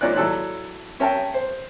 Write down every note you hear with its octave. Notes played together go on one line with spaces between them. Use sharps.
G#2 F3 A#3 C#5 D5 F#6
F#3 E4 A4 D5 F#6
C#4 A#4 E5 G5 A5
C5